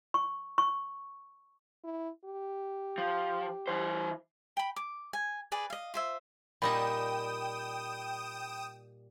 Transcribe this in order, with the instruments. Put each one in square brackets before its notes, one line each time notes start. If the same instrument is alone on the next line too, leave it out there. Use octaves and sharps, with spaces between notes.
[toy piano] C#6
C#6
[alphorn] E4
G4
[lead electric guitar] F3
E3 C5
[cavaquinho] G5 B5
D6
G#5
G#4 B4 D5
D#5 F5
F4 C5 E5
[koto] A#2 G3 D#4 [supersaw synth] G5 D#6 E7 [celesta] B5